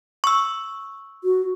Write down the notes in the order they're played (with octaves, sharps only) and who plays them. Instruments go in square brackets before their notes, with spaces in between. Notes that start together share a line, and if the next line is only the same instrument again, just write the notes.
[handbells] C#6 E6
[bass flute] F#4